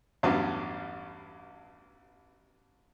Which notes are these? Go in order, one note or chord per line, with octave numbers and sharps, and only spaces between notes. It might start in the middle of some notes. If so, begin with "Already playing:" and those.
A1 E2 G2 F#3